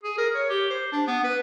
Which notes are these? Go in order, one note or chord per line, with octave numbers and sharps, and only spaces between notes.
G#4
A#4
C#5
G4
C5
D4
B3
B4